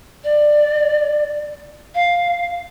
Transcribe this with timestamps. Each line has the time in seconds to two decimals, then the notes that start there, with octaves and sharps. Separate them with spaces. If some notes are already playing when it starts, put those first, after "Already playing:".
0.24 D5
1.95 F5